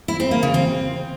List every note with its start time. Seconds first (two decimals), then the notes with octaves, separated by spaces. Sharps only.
0.08 E4
0.20 C4
0.31 A#3
0.43 C#3
0.54 C4